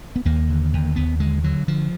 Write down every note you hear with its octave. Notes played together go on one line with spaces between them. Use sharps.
B3
D#2 A#3
D3
D#2
D#2 B3
D3 G#3
D3 F#3
D3 F3